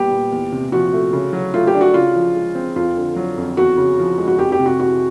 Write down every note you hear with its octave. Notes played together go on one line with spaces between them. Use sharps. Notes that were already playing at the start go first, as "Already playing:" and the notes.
Already playing: A#2 G3 B3 G4
A#2
E2
C3
F3 F#4
A3
C#3
F#3
A3 F4
G4
D4
F#4
C#3 F4
F3
G#3
C4
F2 F4
D3
F#3
F2
E2 F#4
C#3
F3
G#3
F#4
F2 G4
G4
C3
F#4
E3 F#4